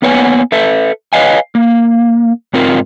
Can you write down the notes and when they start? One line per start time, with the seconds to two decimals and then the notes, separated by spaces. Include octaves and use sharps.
0.02 A#3 B3 B4 C#5 F#5 G#5
0.52 A4 B4 E5
1.13 B4 C#5 D#5 F5 G#5
1.55 A#3
2.53 G#2 C4 F4 A#4